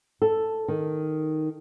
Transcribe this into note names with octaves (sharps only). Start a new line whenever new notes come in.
A4
D#3